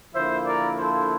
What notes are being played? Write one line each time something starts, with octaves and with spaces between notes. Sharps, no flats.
D3 F3 A#3 E4 C5 E5
A#4 D5
A4 C5